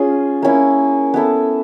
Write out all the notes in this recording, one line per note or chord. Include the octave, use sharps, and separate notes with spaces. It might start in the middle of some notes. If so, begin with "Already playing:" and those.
Already playing: C#4 F4 G#4
A#3 C#4 E4
B3 E4 A4